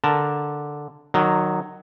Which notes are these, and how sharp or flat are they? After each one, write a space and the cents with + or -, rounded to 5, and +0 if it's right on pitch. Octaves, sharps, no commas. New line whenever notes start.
D3 +0 A#4 -5 A5 +0
D#3 -25 F#3 +0